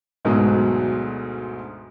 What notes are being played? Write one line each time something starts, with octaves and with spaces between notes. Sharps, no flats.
D2 G#2 B2 F#3 G#3